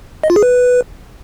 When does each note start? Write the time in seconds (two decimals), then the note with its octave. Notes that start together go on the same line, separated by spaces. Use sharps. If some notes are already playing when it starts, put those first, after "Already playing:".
0.23 D#5
0.30 F4
0.36 G#4
0.43 B4